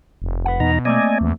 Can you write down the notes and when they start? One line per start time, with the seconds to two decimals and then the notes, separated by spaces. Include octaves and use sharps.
0.22 F1
0.45 B4 F#5
0.60 E2 B2 D#4 A#5
0.85 A3 A#3 C4 D5 D#5 G#5
1.21 E2